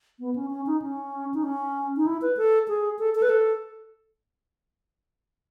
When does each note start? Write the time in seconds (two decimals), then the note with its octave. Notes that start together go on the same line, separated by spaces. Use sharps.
0.19 B3
0.36 C#4
0.50 C#4
0.66 D#4
0.82 C#4
1.34 D#4
1.43 C#4
1.97 D#4
2.06 E4
2.22 B4
2.37 A4
2.68 G#4
2.99 A4
3.15 A4
3.22 B4
3.29 A4